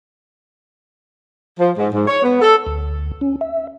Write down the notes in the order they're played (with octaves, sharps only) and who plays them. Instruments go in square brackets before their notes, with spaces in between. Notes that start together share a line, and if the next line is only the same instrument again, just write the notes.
[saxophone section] F3
G#2
G#2
C#5
B3
A4
[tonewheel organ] D2
C#4
E5